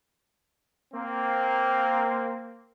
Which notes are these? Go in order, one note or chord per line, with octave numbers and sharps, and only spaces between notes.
A#3 C4